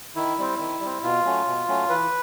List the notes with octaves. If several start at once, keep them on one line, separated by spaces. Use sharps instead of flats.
D#3 E4
G3 C4
D#3
G3 C4
B2 F4
F#3 A3 C#4
B2
F#3 A3 C#4
E3 B4